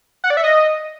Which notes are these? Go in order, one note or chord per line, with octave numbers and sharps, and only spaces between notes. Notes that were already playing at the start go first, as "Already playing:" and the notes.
F#5
D5
E5
D#5